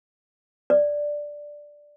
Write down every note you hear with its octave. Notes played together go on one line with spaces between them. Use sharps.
D5